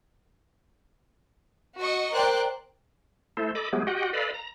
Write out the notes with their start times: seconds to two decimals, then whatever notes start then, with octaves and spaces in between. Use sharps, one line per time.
1.79 F#4 D#5 C#6
2.13 A#4 C5 D5 G5 F#6
3.37 A3 E4 A4 C5
3.55 A4 D#5 B5 D6
3.73 F#3 G#3 A3 B3 G4 G#4
3.87 F#4 G4 D#5 F#5 G5
4.13 A4 B4 D5 D#5 F5 B5
4.34 A#5